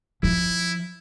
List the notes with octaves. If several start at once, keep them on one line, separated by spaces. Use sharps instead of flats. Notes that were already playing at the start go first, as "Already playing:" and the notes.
F3 E4